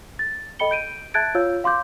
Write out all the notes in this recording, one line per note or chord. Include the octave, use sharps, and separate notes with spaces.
A6
A4 D#5 G5 B5 C#7 G7
G6 D7 D#7
E5 A5 F#6 G#6 A6 D7
F4 C#5 F5 E6 G6
F5 C6 D6 G6